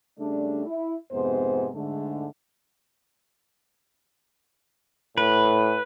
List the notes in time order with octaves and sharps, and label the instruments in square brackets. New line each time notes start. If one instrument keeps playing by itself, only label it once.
[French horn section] C#3 G3 A3 D4
E4
F2 G#2 C3 B3 C5
G#2 D3 A3
[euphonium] A2 [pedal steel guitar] B4